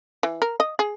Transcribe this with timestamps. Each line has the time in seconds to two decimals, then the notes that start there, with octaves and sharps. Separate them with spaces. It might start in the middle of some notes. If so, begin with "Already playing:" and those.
0.23 E3
0.42 A#4
0.60 D#5
0.79 G#4